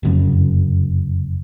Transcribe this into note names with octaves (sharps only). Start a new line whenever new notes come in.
F1 F#2 C#3